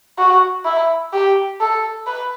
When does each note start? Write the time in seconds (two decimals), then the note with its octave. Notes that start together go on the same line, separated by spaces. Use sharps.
0.18 F#4
0.65 E4
1.13 G4
1.60 A4
2.06 B4